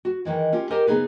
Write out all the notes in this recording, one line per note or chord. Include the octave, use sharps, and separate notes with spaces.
F#4
D#3 E3 G#3
C#4 F4 G4
G4 A#4 C5 D#5 F#5 G#5
C#3 B3 D#4 G#4 B4